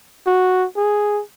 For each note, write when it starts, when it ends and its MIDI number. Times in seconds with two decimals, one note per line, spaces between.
0.27 0.66 66
0.77 1.22 68